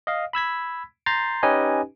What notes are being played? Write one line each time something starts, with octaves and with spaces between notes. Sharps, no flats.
D#5 F5
B5 E6 G#6 B6
A#5 C6 G6 A6 C7
C#4 D#4 G4 B4 D#5 G#5